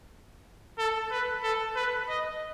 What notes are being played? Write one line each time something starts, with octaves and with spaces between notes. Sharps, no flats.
A4
B4
A4
B4
D#5